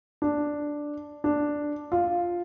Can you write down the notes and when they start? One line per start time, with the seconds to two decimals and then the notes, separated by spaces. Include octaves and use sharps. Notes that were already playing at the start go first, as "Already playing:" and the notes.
0.22 D4
1.24 D4
1.92 F4